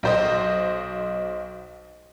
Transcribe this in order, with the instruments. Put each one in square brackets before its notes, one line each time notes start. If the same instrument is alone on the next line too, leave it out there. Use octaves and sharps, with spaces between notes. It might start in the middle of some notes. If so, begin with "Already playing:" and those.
[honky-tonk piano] B1 C5 D#5